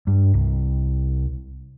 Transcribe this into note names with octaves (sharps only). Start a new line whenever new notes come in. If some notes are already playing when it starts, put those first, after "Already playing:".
G2
C2